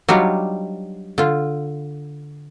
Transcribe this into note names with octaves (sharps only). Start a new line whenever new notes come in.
F#3 G3 D4 D#4 F4
D3 F4